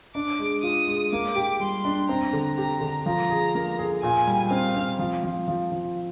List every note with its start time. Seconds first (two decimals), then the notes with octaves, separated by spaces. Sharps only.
0.15 D4 D6
0.39 G#3
0.63 F4 D#6
0.88 G#3
1.13 A#3 D6
1.36 G4
1.60 G3 C6
1.85 D4
2.09 C4 A#5
2.33 D3
2.57 G4 A#5
2.81 D3
3.06 F3 A#5
3.30 G#4
3.55 A#3
3.79 G#4
4.03 A#2 G#5
4.27 G3
4.51 C4 F5
4.76 C4
4.99 F3
5.23 F3
5.48 F3
5.72 F3